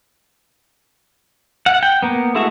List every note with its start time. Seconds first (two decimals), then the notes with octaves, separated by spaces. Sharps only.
1.66 F#5
1.83 G5
2.03 A#3 B3
2.35 G#3 A3 E4 F#4